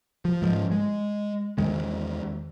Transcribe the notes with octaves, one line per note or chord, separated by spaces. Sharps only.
F3
G#2 F3
G#3
E2 D#3 G#3